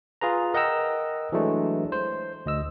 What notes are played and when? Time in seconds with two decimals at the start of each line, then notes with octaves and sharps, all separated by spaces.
0.21 F4 G#4 B4 A#5
0.54 A#4 D#5 F#5 G5 A#5 E6
1.32 E3 F#3 G#3 A3 D4
1.92 C5
2.46 D2 D#5 E6